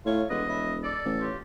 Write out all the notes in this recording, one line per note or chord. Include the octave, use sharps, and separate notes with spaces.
A2 A3 F4 C#5
E1 D3 G#3 B4 D#5
C#4 B4 E5
A4 D5
A1
F4 G4 C#5